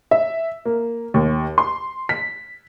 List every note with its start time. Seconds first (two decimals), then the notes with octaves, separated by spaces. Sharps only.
0.11 E5
0.65 A#3
1.14 D#2
1.58 C6
2.09 B6